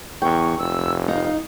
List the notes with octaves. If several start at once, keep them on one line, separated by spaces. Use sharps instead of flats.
E2 G5 C#6
F1 E6
D#4 F5